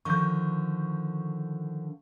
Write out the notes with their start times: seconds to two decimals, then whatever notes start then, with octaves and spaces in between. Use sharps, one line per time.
0.05 D3 D#3 F3 C#6 G6